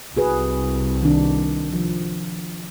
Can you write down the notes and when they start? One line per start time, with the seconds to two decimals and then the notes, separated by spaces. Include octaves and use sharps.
0.17 C2 F#4 G#4 B4
1.02 D#3 D4
1.72 F3